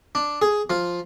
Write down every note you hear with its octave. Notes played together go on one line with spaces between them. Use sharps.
D4
G#4
F3 F4